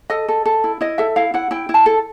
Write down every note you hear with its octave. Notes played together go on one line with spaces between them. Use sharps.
A4 D#5
A4
A4
E4
E4 D#5
A4 E5
E4 F5
E4 F#5
E4 G5
E4
A5
A4